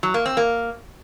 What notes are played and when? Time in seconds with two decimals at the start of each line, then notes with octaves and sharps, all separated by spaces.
0.03 F#3
0.14 A#3
0.26 C4
0.37 A#3